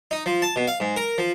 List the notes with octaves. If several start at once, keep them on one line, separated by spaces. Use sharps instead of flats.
D#4
F3
A5
B2
F5
G#2
A#4
F3